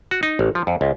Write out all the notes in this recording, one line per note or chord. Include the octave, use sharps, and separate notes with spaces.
F#4
D#4
A1
F3
F2
C#2